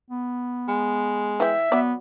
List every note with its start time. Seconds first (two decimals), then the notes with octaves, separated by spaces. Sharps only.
0.10 B3
0.68 G#3
1.40 E3 E5 G5
1.72 F#3 B3 D5